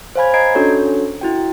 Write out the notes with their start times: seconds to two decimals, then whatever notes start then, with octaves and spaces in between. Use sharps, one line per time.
0.15 C5 C#5 F5 G#5 B5 G#6
0.34 D#5 A#5 G#6 C7 D7
0.55 C#4 D4 F#4 A4 C#5
1.21 E4 F#4 G5